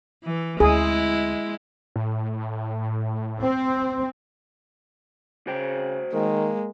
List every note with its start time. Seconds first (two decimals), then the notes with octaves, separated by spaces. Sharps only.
0.24 E3
0.60 D2 G#3 C4 E4 G#4
1.96 A2
3.42 C4
5.47 C#3 F#4 C5 G5
6.13 D#3 G#3 A#3